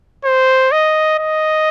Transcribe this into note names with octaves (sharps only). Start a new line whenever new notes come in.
C5
D#5
D#5